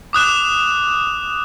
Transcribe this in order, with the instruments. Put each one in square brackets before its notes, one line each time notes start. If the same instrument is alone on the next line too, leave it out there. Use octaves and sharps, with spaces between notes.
[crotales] D6 D#6 F#6 E7